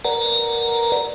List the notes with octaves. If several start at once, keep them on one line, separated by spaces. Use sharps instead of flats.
A#4 B4 D5 F#5 A#5